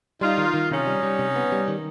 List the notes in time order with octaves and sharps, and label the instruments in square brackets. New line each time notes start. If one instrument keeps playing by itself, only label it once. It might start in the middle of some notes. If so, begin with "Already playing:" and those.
[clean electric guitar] G3 [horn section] D#4 F4
[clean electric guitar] D#3
D#3
[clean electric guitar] C3 [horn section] C#4 D#4
[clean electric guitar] G3
G3
C3
B3
G3
D#3